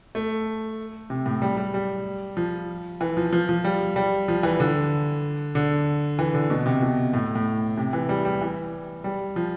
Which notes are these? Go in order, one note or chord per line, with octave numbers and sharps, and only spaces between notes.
A3
C3
A2
G3
G3
G3
F3
E3
F3
F3
F3
G3
G3
F3
E3
D3
D3
E3
D3
B2
C3
B2
A2
A2
C3
E3
G3
G3
E3
G3
F3